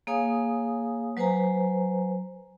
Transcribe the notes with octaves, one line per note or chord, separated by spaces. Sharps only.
A#3 G#4 C#5 F5 G#5 D#6
F#3 B4 C5 G#5 A#5